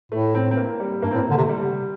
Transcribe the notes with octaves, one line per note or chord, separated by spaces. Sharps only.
A2 A3
C4
C4
A#3
G3
G2 A#3
C4
A2
A#3
D3
C3 A3
G3